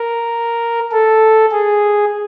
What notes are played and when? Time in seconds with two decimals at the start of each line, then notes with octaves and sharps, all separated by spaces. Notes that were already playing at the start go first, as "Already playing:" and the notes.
Already playing: A#4
0.92 A4
1.51 G#4